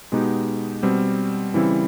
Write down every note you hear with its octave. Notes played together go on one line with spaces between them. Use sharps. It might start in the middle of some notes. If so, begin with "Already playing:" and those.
B2 G#3 B3 D#4 G4
B2 G3 C4
C#3 E3 G3 C4 E4